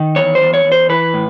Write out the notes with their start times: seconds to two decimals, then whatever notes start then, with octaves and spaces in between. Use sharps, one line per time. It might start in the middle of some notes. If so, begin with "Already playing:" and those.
Already playing: D#3
0.16 E2 C#5
0.35 C5
0.41 E2
0.54 C#5
0.65 E2
0.72 C5
0.89 E3 B4
1.14 A2